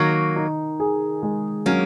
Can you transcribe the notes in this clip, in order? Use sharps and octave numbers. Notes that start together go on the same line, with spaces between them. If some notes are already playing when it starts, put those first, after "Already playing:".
Already playing: D#3 F#3 A#3
D#4
G#4
G#3
F#3 A#3 C#4